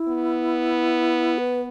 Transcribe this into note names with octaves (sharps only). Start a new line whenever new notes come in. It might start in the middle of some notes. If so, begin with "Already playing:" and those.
Already playing: E4
B3
B4